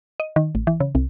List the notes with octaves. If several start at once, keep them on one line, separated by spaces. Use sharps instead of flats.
D#5
D#3
A1
E3
C#3
C2